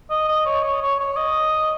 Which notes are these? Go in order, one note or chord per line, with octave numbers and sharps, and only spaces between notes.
D#5
D#5
C#5
C#5
C#5
C#5
D#5